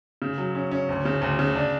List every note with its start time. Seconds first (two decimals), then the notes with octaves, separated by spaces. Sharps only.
0.22 C#3
0.38 F#3
0.55 C#4
0.71 C#4
0.89 D2
1.05 C#3
1.22 D2
1.39 C#3
1.56 D4